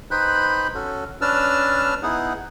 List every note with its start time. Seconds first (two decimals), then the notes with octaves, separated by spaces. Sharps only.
0.11 D#4 B4 C5 G5 B5 F#6
0.75 C#4 F#4 A4
1.21 C#4 D4 B4 A5 E6 F6
2.03 B3 D#4 E4 G#4 F#5